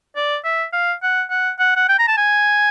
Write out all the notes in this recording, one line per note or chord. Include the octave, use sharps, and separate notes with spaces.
D5
E5
F5
F#5
F#5
F#5
F#5
G5
A#5
A5
G#5